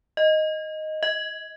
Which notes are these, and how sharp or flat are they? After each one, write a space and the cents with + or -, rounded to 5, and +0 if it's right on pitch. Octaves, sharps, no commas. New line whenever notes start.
D#5 +0
D#5 +35